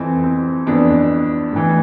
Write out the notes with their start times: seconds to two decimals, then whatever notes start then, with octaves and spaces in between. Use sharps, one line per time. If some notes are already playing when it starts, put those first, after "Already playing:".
Already playing: F2 E3 C4
0.24 C4
0.67 F2 E3 B3 D4
1.52 A2 E3